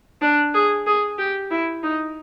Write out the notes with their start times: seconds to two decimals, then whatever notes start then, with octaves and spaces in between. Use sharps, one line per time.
0.22 D4
0.54 G#4
0.87 G#4
1.18 G4
1.51 E4
1.83 D#4